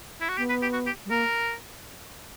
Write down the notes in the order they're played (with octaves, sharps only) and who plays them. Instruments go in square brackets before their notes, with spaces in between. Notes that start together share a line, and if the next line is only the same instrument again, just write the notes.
[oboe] E4
F#4
[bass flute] B3 [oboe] G4
[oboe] B4
G4
F#4
G4
[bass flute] G3
[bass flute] A#3 [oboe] A#4